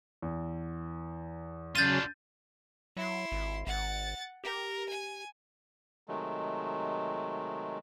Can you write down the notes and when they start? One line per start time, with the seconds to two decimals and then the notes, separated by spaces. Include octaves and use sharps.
0.22 E2
1.75 C#3 F#3 C#4 D4 F4 G6 A6 D#7
2.97 F#3 E4 C6
3.32 G#1
3.67 G#1 F#5 A6
4.44 G4 A#4
4.89 G#5
6.08 C3 D#3 F#3 G#3 A3